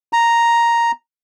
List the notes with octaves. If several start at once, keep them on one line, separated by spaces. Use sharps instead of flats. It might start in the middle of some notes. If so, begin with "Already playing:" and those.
A#5